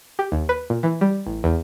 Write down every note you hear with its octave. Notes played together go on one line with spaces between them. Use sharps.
G4
D#2
B4
A#2
E3
G3
A1
E2